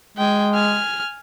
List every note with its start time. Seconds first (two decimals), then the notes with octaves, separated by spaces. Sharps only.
0.18 G#3 G5 G#5
0.54 G#5 F6